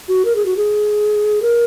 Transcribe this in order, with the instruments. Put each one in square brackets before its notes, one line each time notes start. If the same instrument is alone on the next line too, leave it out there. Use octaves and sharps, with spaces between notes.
[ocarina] F#4
A#4
G#4
F#4
G#4
A#4